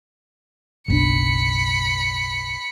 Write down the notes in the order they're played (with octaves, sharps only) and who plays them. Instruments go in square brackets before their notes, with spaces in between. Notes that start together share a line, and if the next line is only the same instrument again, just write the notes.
[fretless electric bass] F#1 B1 D4 [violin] B5 C#7